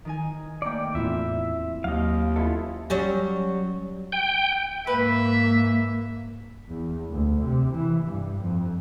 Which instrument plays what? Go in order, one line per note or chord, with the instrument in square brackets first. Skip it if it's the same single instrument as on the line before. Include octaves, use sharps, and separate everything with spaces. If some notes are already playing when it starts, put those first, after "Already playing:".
[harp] D#3 D#4 G#5
[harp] A3 A#3 C#7 [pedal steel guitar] D5 G5
[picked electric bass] E2 A2 [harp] C4 E4 F4 [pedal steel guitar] E5
[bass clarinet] D#2 [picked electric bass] F#3 [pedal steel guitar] D#5 F5
[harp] B3 C#4 [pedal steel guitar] E4 F4 A4
[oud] F#3 G3 C#4
[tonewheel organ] G5
[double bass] G#2 A#3 [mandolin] B4 [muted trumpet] E5
[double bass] E2
D2
C3
E3
G2
F2